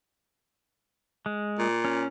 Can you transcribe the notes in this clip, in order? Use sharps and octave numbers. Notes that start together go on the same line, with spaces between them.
G#3
A#2
C#4